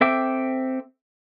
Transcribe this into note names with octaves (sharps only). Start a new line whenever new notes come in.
C4 A4 E5 G5 D6